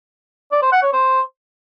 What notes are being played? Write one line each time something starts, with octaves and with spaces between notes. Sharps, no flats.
D5
C5
F#5
C#5
C5